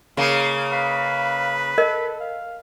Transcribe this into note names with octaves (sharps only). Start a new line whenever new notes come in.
C#3 A#3 F5
B4 F5
A4 A#4 D#5
F5